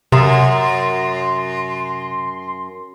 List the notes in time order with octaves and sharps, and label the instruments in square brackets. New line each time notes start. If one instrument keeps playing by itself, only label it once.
[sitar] F#2 [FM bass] C3 [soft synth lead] C6